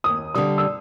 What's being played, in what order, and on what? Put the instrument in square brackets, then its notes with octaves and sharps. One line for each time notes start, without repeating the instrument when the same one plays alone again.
[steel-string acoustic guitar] D#2 [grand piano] D#6
[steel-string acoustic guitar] D3 G3 [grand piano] D#6
[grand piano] E6